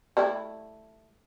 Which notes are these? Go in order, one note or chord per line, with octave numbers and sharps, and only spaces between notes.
G3 A3 E4